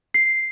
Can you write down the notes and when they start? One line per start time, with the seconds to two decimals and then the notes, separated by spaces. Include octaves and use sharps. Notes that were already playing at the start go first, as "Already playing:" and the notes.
0.14 C7